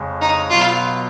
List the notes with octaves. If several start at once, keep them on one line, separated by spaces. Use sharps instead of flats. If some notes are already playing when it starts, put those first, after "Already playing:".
Already playing: F2 C#3 G#3
D#4
B2 F#3 B3 F4